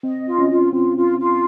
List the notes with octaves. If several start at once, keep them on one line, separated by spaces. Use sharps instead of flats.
C4 D#5
F4
C#4
F4
C4 F4
F4
F4